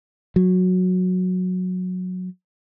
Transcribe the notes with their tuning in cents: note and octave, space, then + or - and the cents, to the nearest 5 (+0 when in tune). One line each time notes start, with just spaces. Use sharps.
F#3 -15